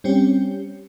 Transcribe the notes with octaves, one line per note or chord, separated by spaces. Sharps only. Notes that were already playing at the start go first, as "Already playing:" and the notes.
G3 C4 C#4 G4